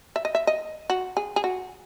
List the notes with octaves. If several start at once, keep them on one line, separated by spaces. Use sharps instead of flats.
E5
D#5
E5
D#5
F#4
G#4
G#4
F#4